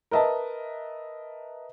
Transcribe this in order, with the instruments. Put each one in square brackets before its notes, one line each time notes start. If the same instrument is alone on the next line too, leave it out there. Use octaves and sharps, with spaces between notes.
[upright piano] A#4 B4 D#5 E5 A5